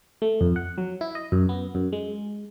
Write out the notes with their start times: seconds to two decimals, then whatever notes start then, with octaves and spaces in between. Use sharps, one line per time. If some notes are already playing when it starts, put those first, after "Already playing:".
0.22 A3
0.41 F2
0.56 F#5
0.78 F#3
1.01 E4
1.15 D#5
1.32 F#2
1.49 B3
1.75 F#2
1.93 G#3